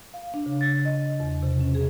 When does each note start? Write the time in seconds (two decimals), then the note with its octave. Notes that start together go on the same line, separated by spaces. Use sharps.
0.14 F5
0.34 D4
0.46 C#3
0.61 A6
0.85 D#5
1.20 E2
1.43 C3
1.60 C#4
1.75 G#4